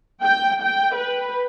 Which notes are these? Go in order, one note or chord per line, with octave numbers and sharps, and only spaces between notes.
G5
G5
B4